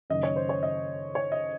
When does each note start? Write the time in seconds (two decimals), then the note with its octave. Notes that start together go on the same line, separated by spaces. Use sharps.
0.10 F#1 F#2 D#3 D#5
0.23 C#5
0.36 C5
0.49 C#5
0.63 D#5
1.15 C#5
1.32 D#5